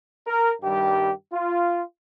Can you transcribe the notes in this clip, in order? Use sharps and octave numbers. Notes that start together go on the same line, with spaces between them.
A#4
G2 D#3 G3 G4
F4